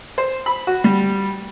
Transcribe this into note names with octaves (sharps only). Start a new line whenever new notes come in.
C5
B5
F#4
G3